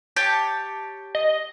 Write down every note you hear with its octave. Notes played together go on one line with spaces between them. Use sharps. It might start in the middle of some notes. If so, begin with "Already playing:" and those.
G4 C#5 A5
D#5